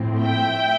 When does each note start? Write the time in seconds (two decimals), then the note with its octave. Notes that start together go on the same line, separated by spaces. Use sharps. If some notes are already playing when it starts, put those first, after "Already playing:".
Already playing: A2 F3 C4
0.21 E5 G5